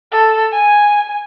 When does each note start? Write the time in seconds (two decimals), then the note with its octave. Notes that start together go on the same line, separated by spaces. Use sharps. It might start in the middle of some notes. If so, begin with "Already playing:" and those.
0.12 A4
0.52 G#5